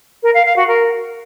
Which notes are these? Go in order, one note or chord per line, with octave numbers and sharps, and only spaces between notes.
A#4
F5
F5
F#4
A#4